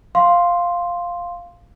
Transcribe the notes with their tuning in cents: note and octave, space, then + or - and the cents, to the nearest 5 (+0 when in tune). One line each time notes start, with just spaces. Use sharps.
F5 +0 C6 +0